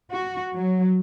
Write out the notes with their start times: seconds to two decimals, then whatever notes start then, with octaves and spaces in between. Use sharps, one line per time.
0.11 F#4
0.54 F#3